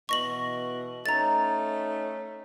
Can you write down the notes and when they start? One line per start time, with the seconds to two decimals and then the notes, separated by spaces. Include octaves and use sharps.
0.09 B2 E3 D#5 C#6 A#6 F#7
1.06 A3 C#4 D#4 A#5 A6